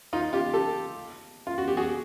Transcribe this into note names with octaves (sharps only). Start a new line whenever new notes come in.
D#4 F4
F4 G4
G4 A4
F4
F#4
G4
F#4 G#4